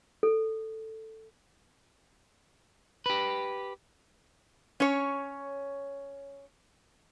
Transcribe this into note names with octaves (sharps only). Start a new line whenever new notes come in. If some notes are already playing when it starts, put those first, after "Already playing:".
A4
G4 B4
C#4 C#5